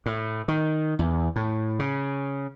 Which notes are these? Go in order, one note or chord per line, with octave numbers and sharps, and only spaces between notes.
A2
D#3
E2
A2
C#3